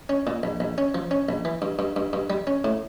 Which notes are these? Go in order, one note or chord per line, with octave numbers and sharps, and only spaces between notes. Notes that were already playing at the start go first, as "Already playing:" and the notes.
C#4
A#2
A#1
A#1
C#4
F3
C#4
A#1
E3
G2
G2
G2
G2
G3
C#4
A2